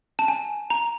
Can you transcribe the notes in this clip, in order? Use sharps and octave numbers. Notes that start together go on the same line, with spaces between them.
A5
G#5
A#5